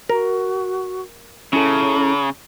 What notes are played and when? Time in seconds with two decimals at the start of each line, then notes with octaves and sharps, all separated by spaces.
0.09 F#4 A#4
1.53 C#3 C#4 E4 A4 A#5